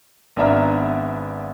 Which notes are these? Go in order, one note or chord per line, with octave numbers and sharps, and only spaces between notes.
G#1 B3 D4 E5 A#5 F6